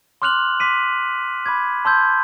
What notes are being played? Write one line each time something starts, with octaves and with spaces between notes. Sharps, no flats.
C6 D6 F6 F#6 F7 F#7
C6 D6 B6 D#7
B5 D6 G#6
A5 C6 E6 G6 G#6